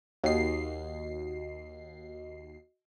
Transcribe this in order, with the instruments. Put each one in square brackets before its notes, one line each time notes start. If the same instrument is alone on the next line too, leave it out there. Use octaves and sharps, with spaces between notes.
[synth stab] D#2 C7 [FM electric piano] F#4 D#5